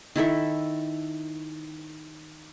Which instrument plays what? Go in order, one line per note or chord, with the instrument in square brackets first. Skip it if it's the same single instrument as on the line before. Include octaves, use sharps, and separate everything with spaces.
[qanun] D#3 E4 A4 E5